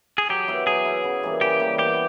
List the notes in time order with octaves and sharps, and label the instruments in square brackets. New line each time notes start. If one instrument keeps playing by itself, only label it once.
[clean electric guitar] G#4
[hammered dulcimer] F#3 [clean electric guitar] G4
[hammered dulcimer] B3 E4
[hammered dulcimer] F#3 [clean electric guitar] G#4
[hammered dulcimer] B3 E4
C#3
E3 G3 A#3
[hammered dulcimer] C#3 [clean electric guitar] G4
[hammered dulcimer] E3 G3 A#3
[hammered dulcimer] B3 [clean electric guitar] G4